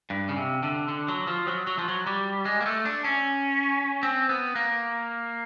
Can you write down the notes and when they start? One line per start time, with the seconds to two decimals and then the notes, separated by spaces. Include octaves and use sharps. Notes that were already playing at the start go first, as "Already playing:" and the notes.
0.10 G2
0.29 C#3
0.37 C3
0.63 D3
0.88 D3
1.08 F#3
1.27 F3
1.48 F#3
1.67 F#3
1.78 F3
1.88 F#3
2.06 G3
2.45 G#3
2.61 A#3
2.66 A3
2.85 D4
3.04 C#4
4.03 C4
4.29 B3
4.55 A#3